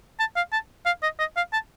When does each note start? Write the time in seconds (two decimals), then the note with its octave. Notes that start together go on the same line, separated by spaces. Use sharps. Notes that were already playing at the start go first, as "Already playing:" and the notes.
0.20 A5
0.36 F5
0.53 A5
0.86 F5
1.03 D#5
1.19 D#5
1.37 F5
1.53 A5